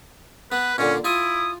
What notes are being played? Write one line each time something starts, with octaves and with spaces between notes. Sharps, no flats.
B3 B4
A#2 D3 C#4
E4 F4 G#5 D#6